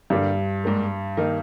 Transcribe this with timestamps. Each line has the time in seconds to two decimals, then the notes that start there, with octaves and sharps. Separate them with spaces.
0.10 G2 D3 G3 A#3 D4
0.64 G#2 G3 A#3
1.17 D#3 A#3 D#4